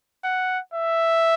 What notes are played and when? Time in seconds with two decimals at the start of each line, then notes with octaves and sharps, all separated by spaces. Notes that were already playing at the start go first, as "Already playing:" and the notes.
0.24 F#5
0.74 E5